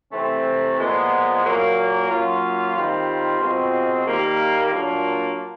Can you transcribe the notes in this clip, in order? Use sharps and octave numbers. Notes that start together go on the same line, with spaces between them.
C3 E3 A3 C4
A#2 F3 G#3 B3
A#2 F#3 A#3
F#3 A#3 C#4 F4
D#3 G3 C4 F4
B2 G#3 C4 F4
D#3 G3 A#3
A#2 F#3 A#3 D4 F4